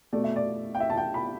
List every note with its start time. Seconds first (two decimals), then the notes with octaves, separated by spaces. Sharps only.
0.13 B2 A3 D5
0.24 E5
0.36 D5
0.75 G5
0.80 E5
0.90 A5
0.97 G5
1.14 B5